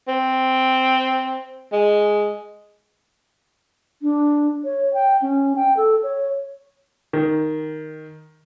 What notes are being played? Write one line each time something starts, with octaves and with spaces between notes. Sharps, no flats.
C4
G#3
D4
C#5
G5
C#4
G5
A4
C#5
D#3